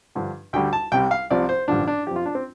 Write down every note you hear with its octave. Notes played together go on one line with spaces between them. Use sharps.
G2 D3 F3
D2 D3 G3 G5
A5
C2 C3 G3 G5
F5
C2 C3 F3 D5
C5
A1 G2 D3 F3 D4
D4
F2 F3 G4
F4
D4
C4